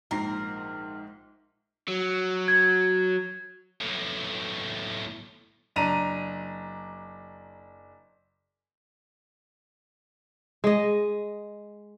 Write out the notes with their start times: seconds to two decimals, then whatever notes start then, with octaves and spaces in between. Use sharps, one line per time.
0.11 A#1 G#2 A#4 C7
1.88 F#3
2.48 G#6
3.81 B1 A2
5.76 F#1 D4 A#5 D#7
10.64 G#3 D#5